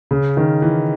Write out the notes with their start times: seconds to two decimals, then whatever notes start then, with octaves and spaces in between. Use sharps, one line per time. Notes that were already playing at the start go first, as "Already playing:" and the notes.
0.11 C#3
0.37 D#3
0.62 E3